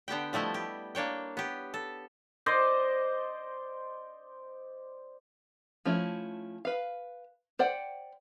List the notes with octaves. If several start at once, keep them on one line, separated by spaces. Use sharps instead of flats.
D3 B3 G4 G5
F3 G3 A3 E4 D#5
G4
A#3 D4 C#5 G5
B3 G4
A4
C5 D5 D#5
F3 A3 C#4 E4
B4 F5
C5 D5 F#5 G5